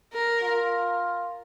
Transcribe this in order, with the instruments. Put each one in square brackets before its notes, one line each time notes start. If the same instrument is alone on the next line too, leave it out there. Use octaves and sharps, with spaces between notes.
[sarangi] A#4
[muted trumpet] F4